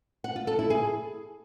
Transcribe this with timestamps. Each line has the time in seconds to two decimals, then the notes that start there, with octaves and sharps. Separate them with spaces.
0.24 F#5
0.36 F4
0.47 A4
0.59 E4
0.70 G#4